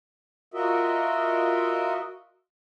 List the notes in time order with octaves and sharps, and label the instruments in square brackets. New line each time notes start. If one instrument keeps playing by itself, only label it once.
[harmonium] F4 F#4 A#4 D#5 E5